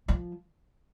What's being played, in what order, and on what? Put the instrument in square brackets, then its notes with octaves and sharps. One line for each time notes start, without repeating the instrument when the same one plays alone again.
[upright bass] F3